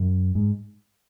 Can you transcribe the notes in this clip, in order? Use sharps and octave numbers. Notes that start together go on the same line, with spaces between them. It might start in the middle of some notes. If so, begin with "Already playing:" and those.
Already playing: F#2
G#2